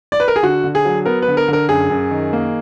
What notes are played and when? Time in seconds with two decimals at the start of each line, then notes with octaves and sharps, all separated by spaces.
0.12 D5
0.20 B4
0.28 A#4
0.36 G#4
0.43 D3 F#4
0.64 D3
0.75 G#4
0.85 F#3
1.05 B3 A#4
1.22 B4
1.28 D3
1.37 A#4
1.48 D3 A#4
1.69 F#2 G#4
1.90 F#2
2.11 D#3
2.33 A#3